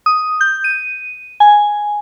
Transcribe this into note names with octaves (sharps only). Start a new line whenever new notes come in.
D#6
G6
D#7
G#5